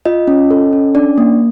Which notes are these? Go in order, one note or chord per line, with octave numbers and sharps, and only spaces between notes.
F4 D#5
C#4
A4
C#4
D4 D5
A#3